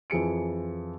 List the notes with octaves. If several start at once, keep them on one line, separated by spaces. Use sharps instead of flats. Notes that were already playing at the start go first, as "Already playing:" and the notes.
F2 E3 G#4 C#7 D7